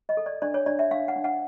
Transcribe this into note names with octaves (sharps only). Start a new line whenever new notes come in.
D#5
A4
D5
D4 D5
C#5
D4 D5
E5
D4 F5
F#5
D4
F#5